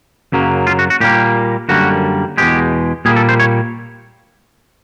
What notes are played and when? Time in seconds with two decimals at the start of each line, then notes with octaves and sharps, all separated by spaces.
0.32 F#2 C#3 F#3 A#3
0.67 F4
0.79 F#4
0.90 F#4
1.00 A#2 G3 A#3 G4
1.69 F#2 D3 G3 A#3 F#4
2.38 E2 B2 G#3 G4
3.05 A#2 G3 A#3 G#4
3.16 A4
3.29 C5
3.39 C#5